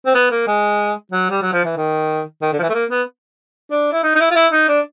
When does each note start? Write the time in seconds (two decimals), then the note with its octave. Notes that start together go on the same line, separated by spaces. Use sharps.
0.06 C4
0.15 B3
0.31 A#3
0.47 G#3
1.12 F#3
1.31 G3
1.42 F#3
1.53 F3
1.65 E3
1.77 D#3
2.42 D#3
2.52 D3
2.59 F3
2.63 E3
2.69 A3
2.74 A#3
2.91 B3
3.71 D4
3.93 E4
4.04 D#4
4.15 D#4
4.20 E4
4.31 F4
4.36 E4
4.52 D#4
4.68 D4